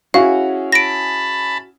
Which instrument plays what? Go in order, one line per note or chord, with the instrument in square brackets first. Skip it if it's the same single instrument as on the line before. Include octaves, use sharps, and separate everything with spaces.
[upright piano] C#4 E4 G#4 [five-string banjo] F#4 [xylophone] F5
[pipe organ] A5 B5 [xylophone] A#6 D7